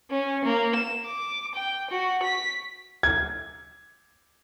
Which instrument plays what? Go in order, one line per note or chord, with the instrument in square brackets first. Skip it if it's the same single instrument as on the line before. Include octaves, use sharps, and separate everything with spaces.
[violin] C#4
A#3
E7
D6
G5
F#4
B6
[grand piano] G#6